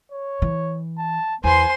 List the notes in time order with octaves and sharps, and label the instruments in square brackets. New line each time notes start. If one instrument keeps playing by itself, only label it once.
[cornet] C#5
[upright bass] E3
[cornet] A5
[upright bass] E2 [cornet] B4 [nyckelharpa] C5 C6 [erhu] G#5